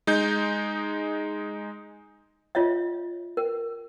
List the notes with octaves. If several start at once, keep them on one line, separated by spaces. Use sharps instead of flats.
G#3 D#4 G6
F4 C#5 D#5 E5
A#4